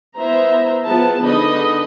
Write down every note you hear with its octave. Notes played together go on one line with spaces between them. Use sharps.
B3 E4 C5 E5 A#5
F3 B3 G#4 A5
D3 B3 D#4 G#4 D#5 B5